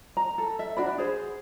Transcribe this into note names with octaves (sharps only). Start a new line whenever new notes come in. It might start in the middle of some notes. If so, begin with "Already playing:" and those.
A#5
A4
E5
D4 F#4 D5 B5
G#4 C5